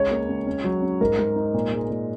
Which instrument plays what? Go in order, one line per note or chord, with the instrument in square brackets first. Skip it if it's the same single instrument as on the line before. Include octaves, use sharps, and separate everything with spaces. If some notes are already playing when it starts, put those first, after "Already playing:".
Already playing: [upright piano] C#2 [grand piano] C#5
[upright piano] A#3
C#2
C#4
F#3
C#4
[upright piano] G#2 [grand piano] A#4
[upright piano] G#2
D#4
A#2
G#3
A#2